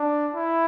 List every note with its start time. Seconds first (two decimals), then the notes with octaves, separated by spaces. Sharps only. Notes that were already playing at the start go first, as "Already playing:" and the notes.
Already playing: D4
0.34 E4